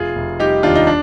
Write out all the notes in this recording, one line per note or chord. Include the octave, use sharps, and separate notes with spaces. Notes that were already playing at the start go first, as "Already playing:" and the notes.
Already playing: F1 F4 G#4
F1
G3 D#4 G4
D#2 D4 F4
D#4
D4